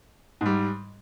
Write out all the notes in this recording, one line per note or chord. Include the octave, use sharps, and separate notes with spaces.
G#2 G3